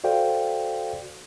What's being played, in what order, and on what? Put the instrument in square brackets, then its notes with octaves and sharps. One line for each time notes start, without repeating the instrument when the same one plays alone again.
[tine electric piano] F#4 A4 C5 D5 F5 G5